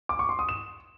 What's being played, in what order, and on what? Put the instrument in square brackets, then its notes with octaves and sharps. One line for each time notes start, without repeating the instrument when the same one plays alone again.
[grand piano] D6
C#6
C6
D#6
E7